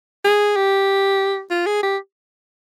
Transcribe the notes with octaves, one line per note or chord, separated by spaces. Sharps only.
G#4
G4
F4
G#4
G4